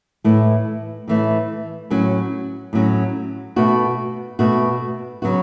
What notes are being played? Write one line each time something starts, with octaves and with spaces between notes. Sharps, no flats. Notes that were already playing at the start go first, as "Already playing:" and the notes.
A2 E3 A3
A2 E3 A3
A2 F#3 C#4
A2 F#3 C#4
B2 A3 F#4
B2 A3 F#4
C#3 F#3 B3 F#4